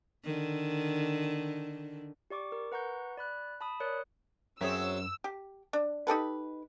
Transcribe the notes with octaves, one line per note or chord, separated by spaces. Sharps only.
D3 D#3
G4 D5 C#6 D6
A#4
B4 F#5 A#5 C#6 G6
D5 B5 F#6
A5 B5 D#6
A#4 C#5 D5 D#6 F#6 C#7
F#2 F#3 C4 G#4 C#5 E5 E6
G4
D4
D#4 G4 A4 B4